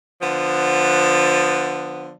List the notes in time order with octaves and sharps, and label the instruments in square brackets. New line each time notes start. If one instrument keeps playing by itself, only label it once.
[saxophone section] D3 F3 B3